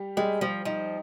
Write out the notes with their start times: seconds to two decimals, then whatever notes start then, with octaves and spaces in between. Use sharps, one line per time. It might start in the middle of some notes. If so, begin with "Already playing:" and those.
Already playing: G3 G4
0.17 G3 G#3 G4
0.41 F3 G3 G4
0.65 F3 D#4